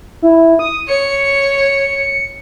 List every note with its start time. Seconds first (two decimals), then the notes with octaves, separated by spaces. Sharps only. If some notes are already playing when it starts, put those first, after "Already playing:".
0.22 E4
0.59 D#6
0.88 C#5 C#7